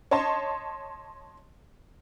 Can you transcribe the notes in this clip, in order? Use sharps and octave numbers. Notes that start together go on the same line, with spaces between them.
C#5 D#5 A5 C6